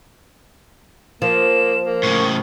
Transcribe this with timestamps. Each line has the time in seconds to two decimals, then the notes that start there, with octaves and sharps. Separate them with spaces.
1.22 F3 A#3 E7
1.84 A#3
2.03 A2 C#3 C#6